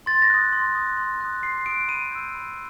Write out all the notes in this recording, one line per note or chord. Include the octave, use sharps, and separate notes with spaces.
C6 A6
A#6
D#6 F#6
C6
D#6 F#6
C6
D#6 F#6
C6 C7
D#6 F#6 D7
B5 D#7
E6 G6
B5